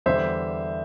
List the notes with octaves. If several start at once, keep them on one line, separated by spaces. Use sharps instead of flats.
E2 D3 G3 C5 E5